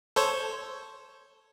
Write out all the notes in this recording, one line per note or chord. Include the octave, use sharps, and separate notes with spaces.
A4 C5 C#5